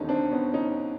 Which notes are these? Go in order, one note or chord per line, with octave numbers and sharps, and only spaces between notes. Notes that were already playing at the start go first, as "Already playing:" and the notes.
Already playing: E1 D#2 D3 C#4 D#4
C4 D4
B3 C#4
C#4 D#4